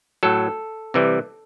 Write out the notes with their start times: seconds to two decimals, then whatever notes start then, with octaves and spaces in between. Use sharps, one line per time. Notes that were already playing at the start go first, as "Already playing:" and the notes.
0.23 A2 F#3 A4
0.94 C3 E3 G3